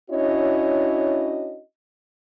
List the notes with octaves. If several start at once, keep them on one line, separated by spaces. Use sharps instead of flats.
C#4 D4 E4 F#4 C#5 D#5